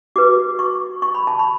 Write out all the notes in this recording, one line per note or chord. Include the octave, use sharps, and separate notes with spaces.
F#4 B4 D6
C#6
C#6
B5
A5
B5